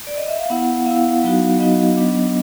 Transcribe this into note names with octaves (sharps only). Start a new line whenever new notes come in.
D5
D#5
E5
F5
B3 E4 F#5
B3 E4 F5
F#3 B3 D#4 F#4
F#3 B3 D#4 F#4 D#5
F#3 B3 D4